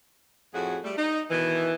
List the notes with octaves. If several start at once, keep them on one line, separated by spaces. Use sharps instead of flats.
F2 A2 F#4 G#4 F#5
G3 A3
D#4
B2 D#3 E3